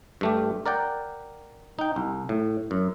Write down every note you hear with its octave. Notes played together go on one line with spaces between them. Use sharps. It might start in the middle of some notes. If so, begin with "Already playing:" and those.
G2 A3 G4
A#4 D5 F#5 G5
D#4 G5
C2
A2
F#2